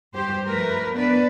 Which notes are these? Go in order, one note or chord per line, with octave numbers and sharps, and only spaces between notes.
G2 G4 C5
F3 A3 A#4 B4
B3 D4 B4 D5